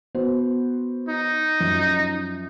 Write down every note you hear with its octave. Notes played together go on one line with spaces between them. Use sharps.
B3 F#4 C5
D#4
F#2 F3